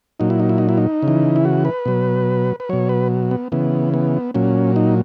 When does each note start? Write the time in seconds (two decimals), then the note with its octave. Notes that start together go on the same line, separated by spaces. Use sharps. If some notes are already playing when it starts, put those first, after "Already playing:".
0.20 A#2 F#3 D#4
0.30 E4
0.40 D#4
0.49 E4
0.58 D#4
0.69 E4
0.77 D#4
1.03 C#3
1.08 E3
1.36 E4
1.45 F#4
1.65 B4
1.86 B2 F#3
2.60 B4
2.69 B2 F#3 C#5
2.89 B4
3.31 B3
3.52 C#3 E3 B3
3.94 B3
4.34 A#2 F#3 C#4
4.76 D#4